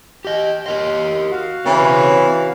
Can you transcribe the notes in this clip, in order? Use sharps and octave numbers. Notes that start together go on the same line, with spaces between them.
G4 D#5 G5
G4 A#4 D#5 C6
F#4 F5
C#3 E3 C4 C#5 E5